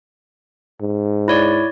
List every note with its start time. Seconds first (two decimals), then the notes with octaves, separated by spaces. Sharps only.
0.81 G#2
1.28 E4 C#5 D5